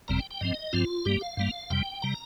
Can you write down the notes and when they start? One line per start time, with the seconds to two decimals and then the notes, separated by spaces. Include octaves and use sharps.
0.08 G1 F2 C3 G3 C4 A#5
0.19 G5
0.31 G5
0.41 G2 F3 C4 D#5
0.73 G2 F3 C4 F4
1.05 G2 G3 A#3 G4
1.21 F5
1.37 G2 G3 A#3
1.70 F2 C3 G3 G5
2.02 C3 G3 A#5